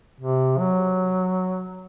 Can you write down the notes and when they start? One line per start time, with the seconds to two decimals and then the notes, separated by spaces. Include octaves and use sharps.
0.20 C3
0.59 F#3